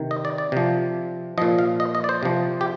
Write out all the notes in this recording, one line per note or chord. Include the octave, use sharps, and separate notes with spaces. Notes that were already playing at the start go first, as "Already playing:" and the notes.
Already playing: C3 D#3
D#5
D5
D5
C3 F3
A#2 F3 D#5
F5
D#5
D#5
D5
C5
C3 F3
G4